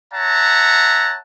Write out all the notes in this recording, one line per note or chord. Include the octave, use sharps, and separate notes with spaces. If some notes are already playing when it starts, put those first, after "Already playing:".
C#5 E5 F#5 A5 A#5